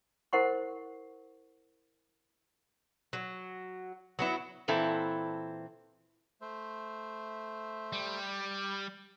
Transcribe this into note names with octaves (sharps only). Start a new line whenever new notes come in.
E4 A#4 C5 F#5 C6 C#6
F#3
F#3 B3 E4
A#2 E3 C4 E4 A4
A3 C5 E5
G3